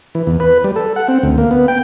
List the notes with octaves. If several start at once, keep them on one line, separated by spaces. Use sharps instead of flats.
E3
E2
B4
G3
A4
F#5
C4
D2
A#3
B3
G5